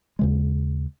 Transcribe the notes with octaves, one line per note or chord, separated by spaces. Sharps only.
D#2 C#3 G#3